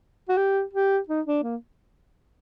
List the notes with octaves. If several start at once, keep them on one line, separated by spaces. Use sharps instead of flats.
F#4
G4
G4
D#4
D4
A#3